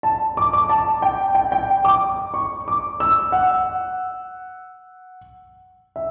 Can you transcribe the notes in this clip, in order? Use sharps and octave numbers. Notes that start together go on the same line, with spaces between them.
A5
D6
D6
A5
G5
G5
G5
D6
C#6
D6
E6
F#5
E5